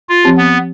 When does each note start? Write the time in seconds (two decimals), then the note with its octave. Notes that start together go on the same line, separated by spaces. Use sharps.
0.09 F4
0.24 F3 C4 G4
0.38 B3